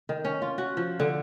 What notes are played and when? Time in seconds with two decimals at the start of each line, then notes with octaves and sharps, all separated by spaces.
0.09 D#3
0.25 C#4
0.42 F4
0.58 F#4
0.77 F3
1.00 D3